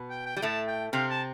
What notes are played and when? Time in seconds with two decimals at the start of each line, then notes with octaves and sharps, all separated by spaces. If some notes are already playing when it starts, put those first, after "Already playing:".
Already playing: B2 B3
0.10 G5
0.26 G5
0.36 G3 G5
0.42 A2 A3 A5
0.68 G5
0.93 C3 C4 F5
1.10 A5